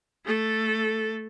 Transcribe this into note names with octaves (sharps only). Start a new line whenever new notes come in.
A3 A4